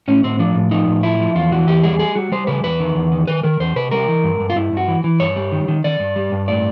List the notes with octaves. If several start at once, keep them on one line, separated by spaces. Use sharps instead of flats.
A2 C#4
A2 C4
F3 D4
A2
F3 D#4
A2
F3 E4
F3
E2 F4
E3 F#4
E2 G4
G3 G#4
G3 G#4
G3 F#4
G3 C5
C#3 B4
E2 B4
D#3
E2
D#3
D#3 B4
D#3 A#4
E2 C5
C3 B4
G3 A#4
E3
G2
G2
F4
G2 E4
G2 F#4
E3
E3
G2 C#5
G3
D#3
D#3
D#3 D5
G2
G3
G2
A2 D5